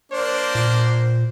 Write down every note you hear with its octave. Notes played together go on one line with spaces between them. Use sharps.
A#3 D4 C5
A#2